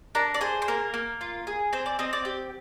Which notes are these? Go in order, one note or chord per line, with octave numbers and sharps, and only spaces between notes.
D4 A#4
D5
G#4 C5
C5
A#3 A#4
A#3
F4
G#4
C4 C5
D5
C4 D#5
D5
G4